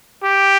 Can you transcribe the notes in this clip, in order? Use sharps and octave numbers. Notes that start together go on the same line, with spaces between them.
G4